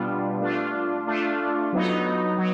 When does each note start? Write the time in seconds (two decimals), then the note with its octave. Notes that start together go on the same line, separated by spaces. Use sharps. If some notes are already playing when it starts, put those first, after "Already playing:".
Already playing: B2 G3 B3 D4 F4
0.41 A3 D4 F4
1.07 A3 D4 F4
1.73 F#3 B3 D#4
2.38 F#3